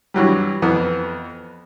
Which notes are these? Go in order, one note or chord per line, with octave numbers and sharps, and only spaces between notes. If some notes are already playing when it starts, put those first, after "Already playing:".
G2 E3 F#3 G3
F2 E3 B3